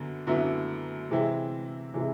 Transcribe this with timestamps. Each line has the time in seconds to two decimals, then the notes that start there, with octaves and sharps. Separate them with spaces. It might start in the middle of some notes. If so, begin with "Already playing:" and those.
Already playing: F#2 D3 F#3 B3
0.27 F#2 D3 F#3 B3 E4
1.11 C3 E3 G#3 C4 E4
1.94 C3 E3 G#3 C4 E4